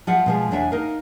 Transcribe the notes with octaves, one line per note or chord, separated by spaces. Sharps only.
F3 F4 E5 F#5
B2 F3 G#3
E2 D4 C#5 E5 G#5
D#4 A#4 F5